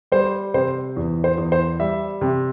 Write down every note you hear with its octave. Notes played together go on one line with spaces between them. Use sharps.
G3 C5
C3 C5
E2
C5
E2
C5
G3 E5
C3